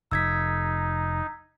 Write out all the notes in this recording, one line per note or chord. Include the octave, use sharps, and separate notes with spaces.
F1 D#4 E6 G#6 B6